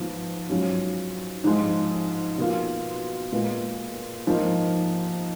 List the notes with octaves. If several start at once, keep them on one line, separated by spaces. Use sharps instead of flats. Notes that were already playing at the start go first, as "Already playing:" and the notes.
Already playing: G#2 F3 B3
G#2 F#3 C#4 F4
G#2 F3 G#3
B2 A#3 F4
A#2 G#3 B3 F4
G#2 F3 A#3 D#4